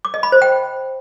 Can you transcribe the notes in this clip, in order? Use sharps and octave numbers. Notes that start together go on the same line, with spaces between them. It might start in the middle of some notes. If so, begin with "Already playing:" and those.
D6
D#5
B5
C5
G5